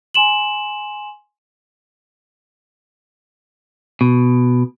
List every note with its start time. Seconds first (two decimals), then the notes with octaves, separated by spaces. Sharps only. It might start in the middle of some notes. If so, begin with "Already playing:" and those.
0.14 G#5 C6 E7 F#7
4.01 B2